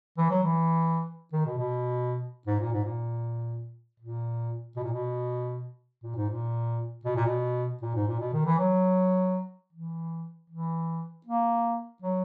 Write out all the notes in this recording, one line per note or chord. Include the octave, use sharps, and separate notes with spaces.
E3
F#3
E3
D#3
B2
B2
G#2
A#2
G#2
A#2
A#2
B2
A#2
B2
A#2
G#2
A#2
B2
A#2
B2
A#2
G#2
A#2
B2
D#3
E3
F#3
E3
E3
A#3
F#3